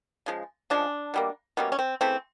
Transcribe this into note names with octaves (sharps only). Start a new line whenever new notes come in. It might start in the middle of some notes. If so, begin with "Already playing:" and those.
C#3 F3 G#3
C#3 F3 G#3 D4
B2 G3 A#3
B2 G3 A#3 C#4
C#4
C4
C#3 E3 A3 C4